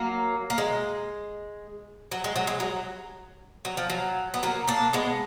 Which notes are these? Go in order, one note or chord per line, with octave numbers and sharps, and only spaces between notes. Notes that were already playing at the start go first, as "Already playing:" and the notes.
Already playing: F#3 A#3
A#3
G#3
F#3
G#3
F#3
G#3
F#3
F#3
F3
F#3
B3
F#3 A#3
A#3 D4
G#3 B3